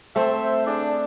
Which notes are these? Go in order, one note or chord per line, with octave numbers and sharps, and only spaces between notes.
A3 C4 A4 C5 E5 G5
D4 G#4 D5 D#6